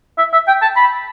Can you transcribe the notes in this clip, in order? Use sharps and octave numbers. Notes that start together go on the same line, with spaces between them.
E5
E5
G5
A5
B5